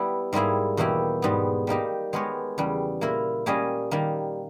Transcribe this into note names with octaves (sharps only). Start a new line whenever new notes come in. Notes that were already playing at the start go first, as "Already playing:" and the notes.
Already playing: G3 B3 E4
G#2 G3 A#3 E4 G#4
E2 B2 A#3 E4 G4
G#2 G3 B3
G3 A#3 D#4 G4
G#3 B3 G4 A#4 C#5
E2 C#3 G3
A#2 A#3 E4 A#4
G3 A#3 C#4 G#4 D#5
D#3 G3 A#3